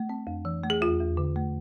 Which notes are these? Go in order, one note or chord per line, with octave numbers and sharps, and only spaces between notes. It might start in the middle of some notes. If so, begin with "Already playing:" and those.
Already playing: A3
C4
F2
E3
A3
G#4
E2 F4
E2
D3
A3